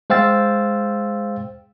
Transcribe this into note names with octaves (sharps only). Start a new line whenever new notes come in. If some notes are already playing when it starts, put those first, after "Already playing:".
G#3 C5 F5 G5 E6 A6